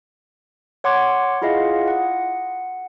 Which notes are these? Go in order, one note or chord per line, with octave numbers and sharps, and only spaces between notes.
C#5 F#5 C6 D6 G#6
E4 F4 G#4 D#5 F5 F#5
F#5